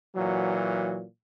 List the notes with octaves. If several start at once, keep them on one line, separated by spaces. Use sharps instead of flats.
A#2 E3 F#3